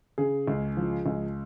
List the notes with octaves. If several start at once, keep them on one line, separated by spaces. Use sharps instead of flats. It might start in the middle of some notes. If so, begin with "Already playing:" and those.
C#3 G#4
C#2
F3
C#2